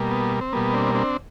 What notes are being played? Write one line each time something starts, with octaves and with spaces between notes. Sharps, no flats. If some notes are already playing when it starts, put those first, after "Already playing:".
Already playing: B2 G3 A#3
B3
C4
B2 G3 A#3 B3
C4 D4
C4 D4